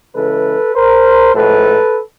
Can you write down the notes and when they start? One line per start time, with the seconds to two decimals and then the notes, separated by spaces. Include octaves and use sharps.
0.14 C#3 E3 G#3 A4 B4
0.75 A#4 C5
1.35 A2 F3 G#3 A4 B4